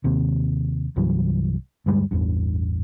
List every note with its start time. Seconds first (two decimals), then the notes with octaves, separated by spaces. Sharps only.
0.04 D#2 C3
0.96 C2 G2 E3 F#3
1.86 D2 G2 G3 G#3
2.11 A1 E2 G2